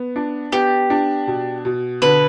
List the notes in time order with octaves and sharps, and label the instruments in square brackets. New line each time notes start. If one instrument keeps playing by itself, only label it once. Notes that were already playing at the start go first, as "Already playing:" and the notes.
Already playing: [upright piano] B3
D4
[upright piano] B3 [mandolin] G4
[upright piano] D4
B2
B2
[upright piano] D3 [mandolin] B4